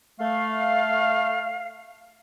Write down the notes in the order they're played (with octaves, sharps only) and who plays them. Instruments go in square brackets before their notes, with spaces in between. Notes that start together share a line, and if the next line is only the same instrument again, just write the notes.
[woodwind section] A3 F5